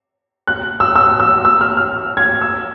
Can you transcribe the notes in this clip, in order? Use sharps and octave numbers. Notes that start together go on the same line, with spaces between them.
F#6
E6
E6
E6
E6
F6
F6
G#6
E6